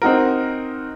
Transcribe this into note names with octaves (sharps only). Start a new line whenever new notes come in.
C4 D#4 F#4 A#4